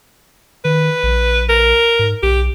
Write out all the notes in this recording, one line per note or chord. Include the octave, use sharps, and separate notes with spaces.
D#3 B4
A#1
A#4
G#2
B1 G4